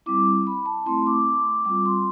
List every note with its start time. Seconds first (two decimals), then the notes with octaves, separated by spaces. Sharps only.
0.06 G3 C4 E4 D6
0.47 B5
0.66 A5
0.86 A3 C4 E4 C6
1.06 D6
1.65 G3 C4 F4 D6
1.85 C6